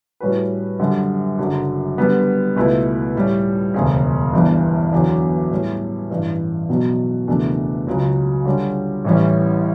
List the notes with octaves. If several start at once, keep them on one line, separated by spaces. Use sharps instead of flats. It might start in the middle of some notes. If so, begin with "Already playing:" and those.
A2 G3 C#4 F#4 B4
F#2 D3 G3
F#1 F#2 D3 F#3
D3 G3 B3
C#2 B2 A3 E4 B4
A2 G3 C#4
E1 D2 C#3
G1 G2 E3
E2 D3 F#3 C#4
A2 G3 C#4
A1 G2 E3
B1 B2 F#3
F#1 E2 B2 A3 D4
C#2 C#3 F#3
D3 G3 C#4
A1 A2 E3 G3 C#4